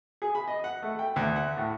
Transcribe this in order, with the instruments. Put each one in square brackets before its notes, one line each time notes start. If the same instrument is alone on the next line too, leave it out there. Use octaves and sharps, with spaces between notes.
[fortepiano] G#4
B5
D#5
F#5
A3
G5
D2
F#5
A2